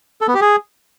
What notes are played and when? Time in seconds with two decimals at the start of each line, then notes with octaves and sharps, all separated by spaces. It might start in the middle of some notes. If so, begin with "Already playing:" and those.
0.21 A4
0.28 B3
0.34 G4
0.41 G#4